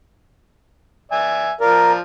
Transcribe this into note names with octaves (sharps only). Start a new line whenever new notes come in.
D5 E5 G#5
F3 A#4 D5 F5